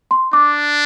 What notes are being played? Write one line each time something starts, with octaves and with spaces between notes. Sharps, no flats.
C6
D4 D6